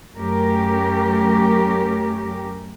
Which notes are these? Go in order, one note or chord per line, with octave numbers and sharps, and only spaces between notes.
F#2 A3 C#4 G4 A#4